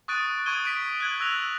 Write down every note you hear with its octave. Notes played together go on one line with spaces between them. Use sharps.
C#6 D#6 F#6 A6 D7 D#7
C#6 D#6 G#6 D#7 G7
B6 D7
F#6 G#6 F#7
E6 F#6 A#6 F7